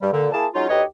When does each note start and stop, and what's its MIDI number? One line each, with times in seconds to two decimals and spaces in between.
0.01 0.09 43
0.01 0.09 55
0.12 0.28 46
0.12 0.28 50
0.33 0.46 58
0.33 0.46 64
0.33 0.46 68
0.33 0.46 81
0.54 0.68 54
0.54 0.68 56
0.54 0.68 61
0.54 0.68 63
0.54 0.68 65
0.69 0.83 38
0.69 0.83 63
0.69 0.83 67
0.69 0.83 71
0.69 0.83 73
0.69 0.83 75